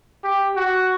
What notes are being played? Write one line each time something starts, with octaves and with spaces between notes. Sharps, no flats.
G4
F#4